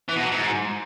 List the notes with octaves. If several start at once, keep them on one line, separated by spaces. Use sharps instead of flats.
E3
B2
F#3
G#2